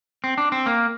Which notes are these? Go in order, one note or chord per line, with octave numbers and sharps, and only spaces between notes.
C4
D4
C4
A#3